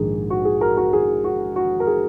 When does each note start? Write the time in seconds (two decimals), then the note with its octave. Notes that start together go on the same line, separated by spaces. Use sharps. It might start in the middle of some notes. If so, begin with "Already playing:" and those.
Already playing: A#1 G#2 D#3 G#3 G#4
0.30 F#4
0.45 G#4
0.61 F#4 A#4
0.77 F#4 A#4
0.93 G#4
1.24 F#4
1.56 F#4
1.80 A#4
1.87 G#4